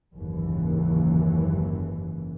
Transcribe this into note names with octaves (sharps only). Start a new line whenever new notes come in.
F#1 D#2 G#2 E3